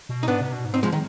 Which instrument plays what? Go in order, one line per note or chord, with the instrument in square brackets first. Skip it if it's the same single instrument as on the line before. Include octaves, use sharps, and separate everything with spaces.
[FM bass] B2
[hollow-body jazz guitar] D#4
[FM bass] G#2 [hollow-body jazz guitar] B3 D4
[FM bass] C3
B2
G#2
[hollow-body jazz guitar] C4 D#4
F3 G#3
D#3